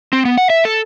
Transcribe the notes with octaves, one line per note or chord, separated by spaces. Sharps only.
C4
B3
F#5
E5
A4